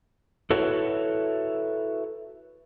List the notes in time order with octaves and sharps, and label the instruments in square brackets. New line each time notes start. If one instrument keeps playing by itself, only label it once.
[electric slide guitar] E4 F#4 A4 B4 C#5 E5